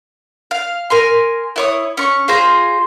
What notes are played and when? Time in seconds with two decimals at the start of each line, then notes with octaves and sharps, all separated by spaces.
0.51 F5
0.90 A#4 G#5 C6
1.56 E4 C#5 D#6
1.97 C#4 C#6
2.28 F4 G#4 C5 A#5